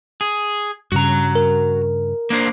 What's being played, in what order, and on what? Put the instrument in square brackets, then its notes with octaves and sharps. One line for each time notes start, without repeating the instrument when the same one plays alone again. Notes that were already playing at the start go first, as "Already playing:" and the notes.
[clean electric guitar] G#4
[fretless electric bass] G2 C#3 [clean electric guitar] F#4 A#5
[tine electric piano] A#4
[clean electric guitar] A#3 D4 C5